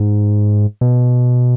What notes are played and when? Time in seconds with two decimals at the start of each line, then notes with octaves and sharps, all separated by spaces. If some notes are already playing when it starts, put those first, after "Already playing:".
Already playing: G#2
0.81 B2